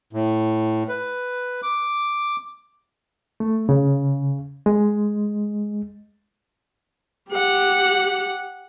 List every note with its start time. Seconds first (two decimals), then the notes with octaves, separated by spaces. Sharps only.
0.13 A2
0.88 B4
1.63 D6
3.40 A3
3.69 C#3
4.66 G#3
7.29 G4 F#5